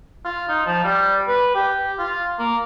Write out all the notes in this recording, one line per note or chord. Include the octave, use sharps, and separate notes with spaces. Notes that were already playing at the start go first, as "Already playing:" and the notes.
F4
D#4
F3
G3
B4
G4
F4
A#3